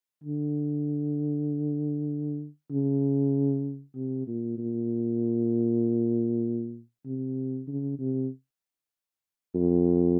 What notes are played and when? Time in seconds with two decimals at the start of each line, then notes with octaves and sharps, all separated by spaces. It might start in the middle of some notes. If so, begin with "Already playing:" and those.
0.24 D3
2.71 C#3
3.95 C3
4.27 A#2
4.58 A#2
7.06 C3
7.68 C#3
7.99 C3
9.55 F2